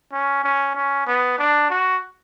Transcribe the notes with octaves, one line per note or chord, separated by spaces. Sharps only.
C#4
C#4
C#4
B3
D4
F#4